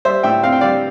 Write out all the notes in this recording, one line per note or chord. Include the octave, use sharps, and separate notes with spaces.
G3 C5 E5
A2 E5 G5
C4 F5
G5
G3 D5 F5